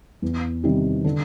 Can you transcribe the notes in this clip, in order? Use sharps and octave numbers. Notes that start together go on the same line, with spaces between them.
E2
C3 D#3 G3
D3